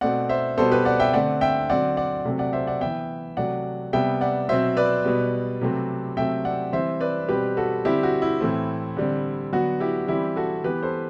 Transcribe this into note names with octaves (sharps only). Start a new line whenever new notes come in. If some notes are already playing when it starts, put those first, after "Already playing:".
B2 A3 C4 D5 F#5
C5 E5
B2 G3 B3 A4 C5
G4 B4
D5 F#5
E5 G5
D3 A3 C4 D5 F#5
E5 G5
D3 F#3 C4 D5 F#5
D5 F#5
C3 F#3 A3 C4
D5 F#5
C5 E5
D5 F#5
E3 B3 E5 G5
C3 F#3 A3 D5 F#5
C3 G3 B3 E5 G5
D5 F#5
B2 F#3 C4 C5 E5
B4 D5
B2 G3 B3
C3 F#3 A3 C4
C3 F#3 A3 C4 E5 G5
D5 F#5
E3 G3 C4 C5 E5
B4 D5
B2 G3 C4 G4 B4
F#4 A4
D3 G3 C4 E4 G4
F#4
E4
A2 E3 A3 C4
D3 G3 C4
D3 F#3 B3 F#4
E4 G4
E3 G3 C4 E4 G4
F#4 A4
E3 B3 G4 B4
A4 C5